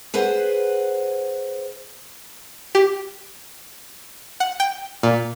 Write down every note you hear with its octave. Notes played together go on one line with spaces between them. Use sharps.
G#4 B4 C5 F#5
G4
F#5
G5
A#2